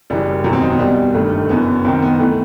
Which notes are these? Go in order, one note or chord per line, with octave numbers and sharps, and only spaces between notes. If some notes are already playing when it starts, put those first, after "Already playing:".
F#1 F#2 E3 G3
E1 E2 D#3 F#3
C4
D#4
B3
C2 B2 G3
G1 G2 D#3 A3
A3
F#1 F#2 E3 B3
C2 C3 D#3 C4
B3
E3 A3